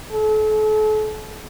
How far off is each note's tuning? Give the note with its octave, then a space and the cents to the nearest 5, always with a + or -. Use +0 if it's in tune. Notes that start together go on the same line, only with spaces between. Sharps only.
A4 -40